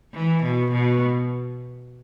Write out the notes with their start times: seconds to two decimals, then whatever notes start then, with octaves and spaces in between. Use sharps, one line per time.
0.14 E3
0.44 B2
0.72 B2